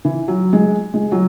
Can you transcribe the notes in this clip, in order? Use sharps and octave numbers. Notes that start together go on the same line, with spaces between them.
E3
F#3
G#3
G#3
F#3